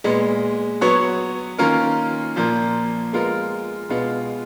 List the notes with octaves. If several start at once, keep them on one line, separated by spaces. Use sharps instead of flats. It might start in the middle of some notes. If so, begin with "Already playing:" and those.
A#2 G#3 B3
F#3 B3 F#4 C#5
D#3 A#3 C#4 F4 A#4
A#2 F3 A#3
G#3 B3 F4 A#4
B2 G#3 B3 F4